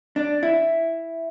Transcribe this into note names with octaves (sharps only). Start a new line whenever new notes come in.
D4
E4